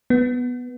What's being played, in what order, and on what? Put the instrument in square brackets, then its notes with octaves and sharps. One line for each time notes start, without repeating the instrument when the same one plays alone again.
[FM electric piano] B3